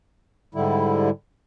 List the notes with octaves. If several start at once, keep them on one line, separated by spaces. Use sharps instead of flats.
G#2 D3 G3 E4